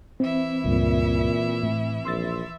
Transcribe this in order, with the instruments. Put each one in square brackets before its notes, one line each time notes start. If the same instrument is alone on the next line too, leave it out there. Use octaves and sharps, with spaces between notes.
[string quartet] E3 E4 E5 [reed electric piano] C4
[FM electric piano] C#2 G2 [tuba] A#2
[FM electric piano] A2
[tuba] A#1 [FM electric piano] C6 E6 A6